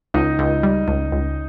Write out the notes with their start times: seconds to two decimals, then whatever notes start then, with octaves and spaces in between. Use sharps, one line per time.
0.14 C#2 D#4 D#5
0.39 C#2
0.63 G3
0.88 C#2
1.12 C#2